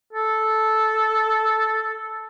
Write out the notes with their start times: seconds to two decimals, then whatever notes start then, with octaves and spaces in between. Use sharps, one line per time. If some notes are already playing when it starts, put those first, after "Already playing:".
0.12 A4